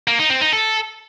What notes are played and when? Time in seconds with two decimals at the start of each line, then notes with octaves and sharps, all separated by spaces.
0.08 A#3
0.19 D#4
0.30 C4
0.41 D#4
0.53 A4